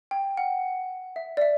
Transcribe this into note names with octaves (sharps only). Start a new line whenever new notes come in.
G5
F#5
E5
D5
E5